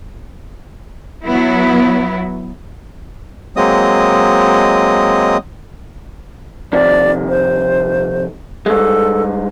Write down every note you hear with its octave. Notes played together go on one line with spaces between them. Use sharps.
F#3 B3 E4
F#3 G#3 A#3 C4 D#5 D#6
F2 C3 D#3 D5
C5
G2 G#3 A4